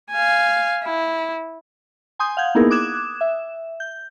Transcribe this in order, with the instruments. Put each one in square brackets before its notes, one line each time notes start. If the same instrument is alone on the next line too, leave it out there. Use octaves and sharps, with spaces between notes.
[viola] F5 G#5
E4
[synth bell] G#5 C6 D#6 G6
F5 F#5 G6 G#6
A#3 B3 D#4 E4 G#4 A#4
D6 D#6 F#6 G#6 E7
E5
G6